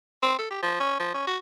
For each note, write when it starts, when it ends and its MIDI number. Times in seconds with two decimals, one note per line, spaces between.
0.22 0.38 60
0.39 0.47 69
0.50 0.59 67
0.63 0.76 53
0.80 0.98 61
0.99 1.13 53
1.14 1.23 61
1.27 1.37 66